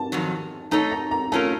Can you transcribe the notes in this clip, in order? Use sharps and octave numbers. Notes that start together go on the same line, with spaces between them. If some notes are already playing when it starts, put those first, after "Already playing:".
Already playing: A5
F2 D#3 F#3
A3 D#4 A4 C#5 A#5
A#5
A#5
A3 C#4 F4 A#4 A5